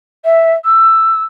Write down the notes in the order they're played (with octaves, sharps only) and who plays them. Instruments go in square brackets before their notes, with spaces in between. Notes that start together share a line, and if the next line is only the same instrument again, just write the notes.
[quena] E5
E6